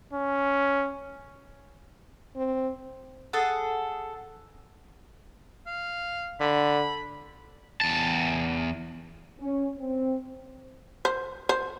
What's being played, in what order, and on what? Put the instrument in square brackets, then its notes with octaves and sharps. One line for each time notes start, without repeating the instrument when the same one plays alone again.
[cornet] C#4
[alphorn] C4
[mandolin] G#4 A4 F#5 A5
[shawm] F5
[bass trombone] D3 [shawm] B5
[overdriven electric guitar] E2 A5
[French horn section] C#4
C4
[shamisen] C5
C5